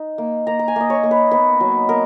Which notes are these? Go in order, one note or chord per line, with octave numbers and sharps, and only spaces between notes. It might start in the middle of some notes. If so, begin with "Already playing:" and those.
Already playing: D#4
A#3
A#3 A#5
A#5
G#5
A#3 D#5
C#5
A#3
B4
B3 B4
F#3
B3 A#4